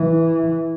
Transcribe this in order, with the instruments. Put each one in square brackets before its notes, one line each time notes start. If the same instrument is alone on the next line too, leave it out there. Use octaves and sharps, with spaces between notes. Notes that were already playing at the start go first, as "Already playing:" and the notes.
Already playing: [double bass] E3